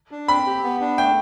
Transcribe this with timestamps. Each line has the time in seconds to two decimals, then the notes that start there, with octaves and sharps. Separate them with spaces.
0.11 D4
0.28 C4 B5
0.46 G4
0.63 B3
0.81 D4
0.98 A3 G5